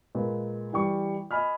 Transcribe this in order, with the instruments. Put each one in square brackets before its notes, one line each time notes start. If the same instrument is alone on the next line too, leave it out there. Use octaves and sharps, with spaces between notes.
[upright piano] A#2 G#3 B4
E3 G3 C#6
D#5 G#5 B5 F6